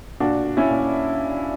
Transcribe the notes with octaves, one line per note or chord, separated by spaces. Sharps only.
A#2 D4 F#4
A#2
C#4 E4
A#2